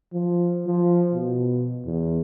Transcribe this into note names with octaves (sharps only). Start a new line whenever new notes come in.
F3
F3
B2
E2